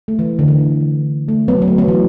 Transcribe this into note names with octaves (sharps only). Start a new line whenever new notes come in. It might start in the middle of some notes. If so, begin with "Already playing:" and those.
A3
E3
D3
E3
A3
F#3 B3
F#3
A3
F#3 B3
E3